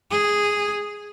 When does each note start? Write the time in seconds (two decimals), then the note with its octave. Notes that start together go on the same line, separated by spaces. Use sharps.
0.11 G#4